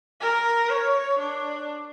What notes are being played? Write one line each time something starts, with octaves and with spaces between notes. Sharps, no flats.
A#4
C#5
D4